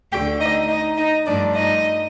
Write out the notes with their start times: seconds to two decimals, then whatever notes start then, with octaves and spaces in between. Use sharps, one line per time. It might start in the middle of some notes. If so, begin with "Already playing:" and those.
0.12 D2 D3 A3 G4 G5
0.40 D#4 D#5
0.69 D#4 D#5
0.97 D#4 D#5
1.26 G2 F3 A3 D4 D5
1.55 D#4 D#5